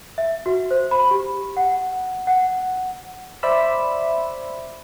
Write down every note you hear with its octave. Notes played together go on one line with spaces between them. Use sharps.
E5
F#4
C5
B5
G4
F#5
F#5
C5 D5 E5 B5 E6